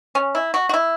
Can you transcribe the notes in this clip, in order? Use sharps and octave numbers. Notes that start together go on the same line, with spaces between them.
C#4
E4
F#4
F#4
E4